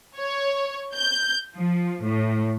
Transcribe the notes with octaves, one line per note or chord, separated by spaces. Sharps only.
C#5
G6
F3
A2